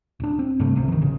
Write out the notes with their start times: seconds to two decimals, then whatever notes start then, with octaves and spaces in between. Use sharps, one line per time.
0.20 D1 D4
0.39 C4
0.60 G2 C3 G3 A3
0.76 G#1 C#2 C3
0.88 D#3 E3
1.01 A1 C#3